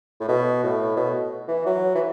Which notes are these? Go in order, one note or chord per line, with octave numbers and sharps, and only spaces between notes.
A2
B2
A2
B2
E3
F#3
E3